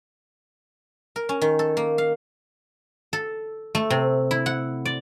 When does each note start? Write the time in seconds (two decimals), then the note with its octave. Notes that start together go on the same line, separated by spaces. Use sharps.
1.16 A#4
1.29 C#4
1.42 D#3
1.59 A4
1.77 A#3
1.98 F5
3.13 A4
3.75 A3
3.90 C3
4.31 E4
4.46 F#5
4.85 D5